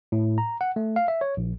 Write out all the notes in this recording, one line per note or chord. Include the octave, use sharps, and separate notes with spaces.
A2
A#5
F#5
A3
F5
E5
C#5
A#1